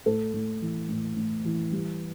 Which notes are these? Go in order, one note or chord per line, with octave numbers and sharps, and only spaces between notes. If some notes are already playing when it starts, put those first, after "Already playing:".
A2 A4
A2
E3
A2
A2
E3
G3